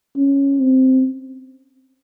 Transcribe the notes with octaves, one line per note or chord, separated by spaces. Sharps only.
C#4
C4